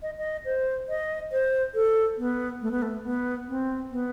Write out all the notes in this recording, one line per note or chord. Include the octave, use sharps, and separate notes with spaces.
D#5
D#5
C5
D#5
C5
A4
B3
A3
B3
A3
B3
C4
B3